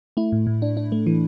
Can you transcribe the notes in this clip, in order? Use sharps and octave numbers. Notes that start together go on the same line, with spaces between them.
A3 E4
A2
A2
D4
D4
A3
E3